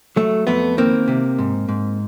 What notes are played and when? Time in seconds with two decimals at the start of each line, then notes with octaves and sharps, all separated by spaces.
0.16 F#3 A3
0.47 F2 A3 B3
0.77 D#3 A#3 C4
1.08 C3
1.39 G#2
1.69 G#2